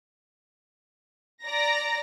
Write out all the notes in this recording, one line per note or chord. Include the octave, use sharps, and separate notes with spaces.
D5 A#5 A#6